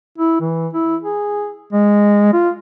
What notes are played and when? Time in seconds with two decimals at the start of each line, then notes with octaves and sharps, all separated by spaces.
0.18 E4
0.40 E3
0.73 E4
1.03 G#4
1.73 G#3
2.33 F4